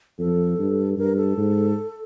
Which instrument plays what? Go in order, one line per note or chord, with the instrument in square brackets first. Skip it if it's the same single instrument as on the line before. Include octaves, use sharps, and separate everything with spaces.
[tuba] F2 [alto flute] A4
[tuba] G2
[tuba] G2 [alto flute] A#4
[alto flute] A4
[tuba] G#2